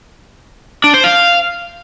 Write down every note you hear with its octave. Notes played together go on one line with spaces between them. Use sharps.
D4
C5
F5